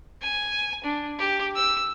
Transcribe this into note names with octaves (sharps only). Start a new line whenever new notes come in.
G#5
D4
G4
E6